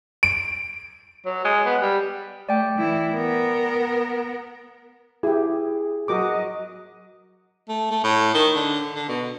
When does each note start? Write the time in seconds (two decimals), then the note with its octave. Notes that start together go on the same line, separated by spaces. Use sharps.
0.23 D7
1.26 F#3
1.45 G#3
1.66 B3
1.82 G3
2.49 A3 D5 G5
2.79 E3 E4
3.14 B3 A#4
5.23 E4 G4 G#4
6.08 F#3 F#4 A#4 D#5 D6
7.69 A3
7.90 A3
8.04 A2
8.34 D#3
8.55 D3
8.95 D3
9.08 B2